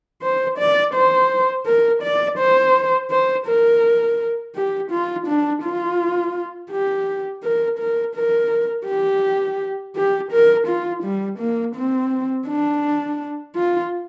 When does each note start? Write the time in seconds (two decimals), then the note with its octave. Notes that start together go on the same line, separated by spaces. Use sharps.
0.22 C5
0.58 D5
0.94 C5
1.66 A#4
2.03 D5
2.38 C5
3.11 C5
3.47 A#4
4.55 G4
4.91 F4
5.27 D4
5.63 F4
6.71 G4
7.43 A#4
7.79 A#4
8.15 A#4
8.87 G4
9.96 G4
10.31 A#4
10.67 F4
11.03 G3
11.39 A#3
11.76 C4
12.48 D4
13.55 F4